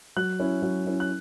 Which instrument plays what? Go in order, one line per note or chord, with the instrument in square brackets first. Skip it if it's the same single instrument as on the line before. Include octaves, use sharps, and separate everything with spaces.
[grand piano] F#3 F#6
C#4 E4
F#3
C#4 E4
F#6